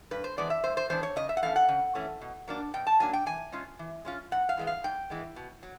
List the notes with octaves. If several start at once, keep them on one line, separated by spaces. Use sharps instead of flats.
G2 B4
C5
E3 G#3 B3 D4 D5
E5
G2 C5
C5
E3 G#3 B3 D4 C5
C#5
C#3 D#5
E5
F#5
E3 A3 C#4 F5
F#5
C#3
E3 A3 C#4
B2
F#3 A#3 D4
B2 G5
A5
F#3 A#3 D4 G#5
G5
E3 G#5
G#3 C#4 F4
E3
G#3 C#4 F4
G#2 F#5
F5
E3 G#3 B3
F5
G#2 G5
E3 G#3 B3
B2
F#3